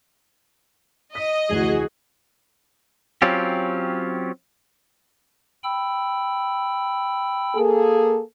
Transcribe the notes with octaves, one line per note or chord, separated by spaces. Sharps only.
D#5 B6
F1 D2 E3 F#4 G#4
F#3 C4 C#4 F4 G4
G5 B5 E6
A#3 G#4 A4